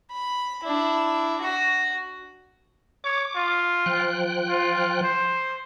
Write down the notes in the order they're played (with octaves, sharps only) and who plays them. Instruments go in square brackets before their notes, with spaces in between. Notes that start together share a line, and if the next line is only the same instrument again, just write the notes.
[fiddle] B5
D4 E4
F#4
[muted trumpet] C#5 [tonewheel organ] D6
[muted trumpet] F4
[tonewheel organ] F3 G5 F#6
[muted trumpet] F4
C5